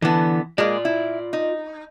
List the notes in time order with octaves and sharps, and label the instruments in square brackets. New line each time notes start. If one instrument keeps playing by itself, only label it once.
[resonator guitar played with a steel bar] D3 B3 [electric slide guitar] E3
[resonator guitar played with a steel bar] G#3 A#3 [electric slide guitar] F4 D5
[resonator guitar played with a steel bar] E4
D#4